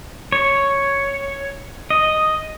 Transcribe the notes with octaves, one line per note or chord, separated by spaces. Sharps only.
C#5
D#5